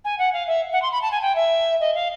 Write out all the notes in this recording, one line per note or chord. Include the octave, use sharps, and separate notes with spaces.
G#5
F#5
F5
E5
F#5
C6
B5
A5
G#5
G5
E5
D#5
F5